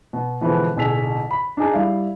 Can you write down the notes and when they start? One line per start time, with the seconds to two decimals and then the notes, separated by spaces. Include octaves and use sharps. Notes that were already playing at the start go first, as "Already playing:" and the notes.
0.13 B2
0.41 B2 D3 E3 F3 G#3 B3
0.76 D1 B1 G#4 E6 B6 F7
1.31 B5
1.57 D4 D#4 G#4 A5
1.73 G3 E4 D5 F5